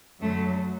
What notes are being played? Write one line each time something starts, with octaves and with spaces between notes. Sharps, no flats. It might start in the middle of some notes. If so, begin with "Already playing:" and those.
F#2 D3 F#3 A3